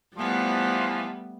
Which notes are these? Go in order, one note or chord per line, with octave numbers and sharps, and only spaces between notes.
E3 F3 G3 A3 B3